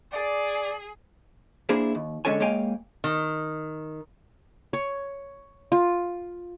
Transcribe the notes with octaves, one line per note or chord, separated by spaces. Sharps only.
G#4 D5
A#3 D4 E4 G#4 C5
D#2
D3 G#3 C#4 A4 C#5 G#5
G#3 A#3 C#5 F5 G5 G#5
D#3
C#5
F4